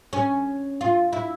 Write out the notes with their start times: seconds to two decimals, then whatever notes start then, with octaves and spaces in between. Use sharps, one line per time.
0.13 C#4
0.81 F4
1.13 E4